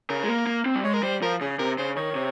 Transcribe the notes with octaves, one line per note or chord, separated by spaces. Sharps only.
C#3 A#4
G#3
A#3
A#3
C4
G3
G#3 C#5
A#4
G3 C5
F3 A#4
C#3 G#4
C3 A#4
C#3 C5
D#3 C#5
C3